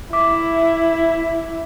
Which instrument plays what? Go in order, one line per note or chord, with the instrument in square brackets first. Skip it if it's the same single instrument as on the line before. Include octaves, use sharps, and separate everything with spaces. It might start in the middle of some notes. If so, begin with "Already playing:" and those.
[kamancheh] E4 [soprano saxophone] E5 [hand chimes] D6